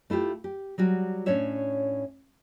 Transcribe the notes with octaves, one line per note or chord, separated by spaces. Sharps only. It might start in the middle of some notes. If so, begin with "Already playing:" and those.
A3 E4 F4 G4
G4
F#3 G3 F#4
A2 C#4 D4 C#5 E5